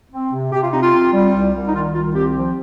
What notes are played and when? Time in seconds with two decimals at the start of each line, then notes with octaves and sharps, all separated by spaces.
0.12 C4
0.32 C3
0.52 C3 G4
0.62 F4
0.72 C4 D#4
0.83 F4
0.93 C4
1.13 G3
1.33 C2
1.53 C2
1.67 D#4
1.73 D#3 F4
1.94 C2 F4
2.14 C4 G4
2.34 F3